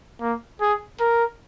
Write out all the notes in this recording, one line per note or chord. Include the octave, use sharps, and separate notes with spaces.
A#3
G#4
A#4